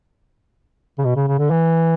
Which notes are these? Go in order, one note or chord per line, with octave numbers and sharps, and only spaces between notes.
C#3
B2
C#3
C#3
D3
E3